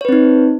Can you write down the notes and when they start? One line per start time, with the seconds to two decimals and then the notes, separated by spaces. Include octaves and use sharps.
0.01 C#5
0.05 B4
0.09 C4
0.12 D#4